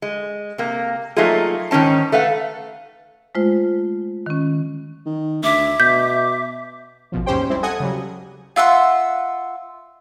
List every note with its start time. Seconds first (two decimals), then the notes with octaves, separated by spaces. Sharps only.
0.02 G#3
0.58 C3 A#3
1.16 F#3 A3 A#3 D#4 F4 G#4
1.71 G#2 D#3 G3 C#4 A5
2.12 A3 B4 F5 F#5
3.35 G#3 A3 F4 C5
4.26 D#3 C#4
5.06 D#3
5.44 D2 E5 D6
5.80 B2 G6
7.12 A1 B2 F3
7.26 D#2 G#2 C#4 G4 C5 G5
7.50 G3 G#3 C4 E4
7.63 A4 D#5 F#5 G#5 D#6 G#6
7.80 C#3 F#3 G3
8.56 F4 E5 F#5 C6